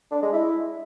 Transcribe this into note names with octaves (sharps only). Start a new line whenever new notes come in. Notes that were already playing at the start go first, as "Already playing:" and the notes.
D4
G#3
E4